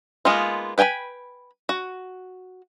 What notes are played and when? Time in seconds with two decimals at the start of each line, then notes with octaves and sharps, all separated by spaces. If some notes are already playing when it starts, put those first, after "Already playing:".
0.25 G#3 A#3 B3 D#4 F4
0.78 B4 G5 G#5 A#5 B5
1.69 F#4